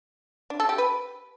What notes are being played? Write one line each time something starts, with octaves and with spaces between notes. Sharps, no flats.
D4
A4
G4
B4